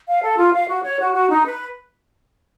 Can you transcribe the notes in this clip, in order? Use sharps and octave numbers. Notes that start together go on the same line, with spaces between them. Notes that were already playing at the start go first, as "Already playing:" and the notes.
F5
A4
F4
F5
F#4
C#5
F#4
F#4
D#4
B4